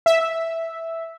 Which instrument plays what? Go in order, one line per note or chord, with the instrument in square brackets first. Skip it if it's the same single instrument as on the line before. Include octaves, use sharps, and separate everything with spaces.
[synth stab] E5